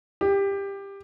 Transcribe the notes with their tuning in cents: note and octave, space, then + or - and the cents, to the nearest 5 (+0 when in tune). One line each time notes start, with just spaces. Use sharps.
G4 +15